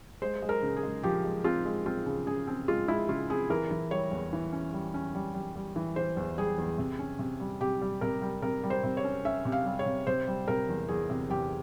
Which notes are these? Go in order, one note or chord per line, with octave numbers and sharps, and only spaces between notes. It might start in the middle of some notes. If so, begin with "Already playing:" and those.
G#3 C5
G#3
A#4
C#3
G#4
G#3
F3 G4
G#3
C4 F4
G#3
C4 F4
C#3
C#3 G#4
C4
G#3 F4
G#3 E4
C#3 F4
C4 G#4
E3 A#4
E3
G3 C#5
E2
E3
C#4
G3
C#4
G3
G3
G3
E3
E3 C5
E2
G3 G#4
E2
C3
C#4
C3
G3
C3 G4
G3
C3 A#4
G3
C3 A#4
G3
C5
C3
C#5
C#4
C#4 E5
C3
F5
G3
C#5
C3
C3 C5
G3
C3 A#4
E2
E2 G#4
C3
E2 G4